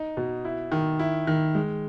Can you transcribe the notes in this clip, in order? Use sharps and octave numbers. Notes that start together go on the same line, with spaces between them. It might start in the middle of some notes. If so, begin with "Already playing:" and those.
Already playing: D#4
B2
E4
D#3
E4
D#3
G#3